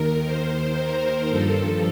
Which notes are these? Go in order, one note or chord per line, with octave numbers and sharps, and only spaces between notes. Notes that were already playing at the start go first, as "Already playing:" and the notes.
Already playing: D#2 D#3 A#4
D#2 D#3 C5
A#4
G2 F3 A4